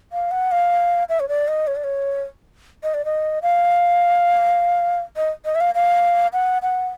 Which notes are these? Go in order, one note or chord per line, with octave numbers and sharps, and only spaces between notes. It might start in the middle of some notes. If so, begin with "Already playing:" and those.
F5
F#5
F5
E5
C#5
D5
D#5
C#5
D5
C#5
D#5
D5
D#5
F5
D#5
D#5
E5
F5
F5
F#5
F#5